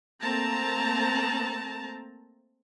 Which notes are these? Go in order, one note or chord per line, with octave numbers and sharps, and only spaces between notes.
A3 A#3 C4 A5 A#5